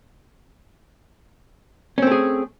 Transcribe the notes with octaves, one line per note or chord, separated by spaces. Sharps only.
A3 C4 C#4 G#4